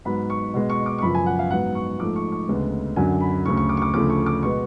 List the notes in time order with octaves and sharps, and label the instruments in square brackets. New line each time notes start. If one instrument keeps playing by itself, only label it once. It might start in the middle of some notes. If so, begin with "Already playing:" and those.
[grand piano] G#2 F#3 B3 B5
C#6
B2 G#3 B3
C#6
D6
C#6
F#2 C#3 F3 B3 B5
G#5
F#5
F5
G#2 F#3 B3 F#5
C#6
G#2 F3 A3 D6
C#6
C#6
D2 C#3 G#3 B3
F#2 D3 F#3 G#5
B5
D2 C#3 F#3 A3 C#6
C#6
D6
C#6
D6
D2 C#3 F3 A3 D6
C#6
D6
B2 G#3 B3 C#6